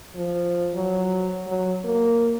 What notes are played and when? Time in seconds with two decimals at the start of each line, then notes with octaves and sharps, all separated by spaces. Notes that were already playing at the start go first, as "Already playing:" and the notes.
0.15 F3
0.75 F#3
1.46 F#3
1.85 A#3